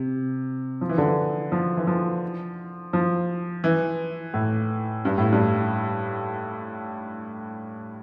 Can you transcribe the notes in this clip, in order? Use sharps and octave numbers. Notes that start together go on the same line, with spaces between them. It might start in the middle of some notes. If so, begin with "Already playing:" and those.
Already playing: C3
F3
E3
D3
E3
F3
E3
F3
F3
E3
A2
G2
A2
G2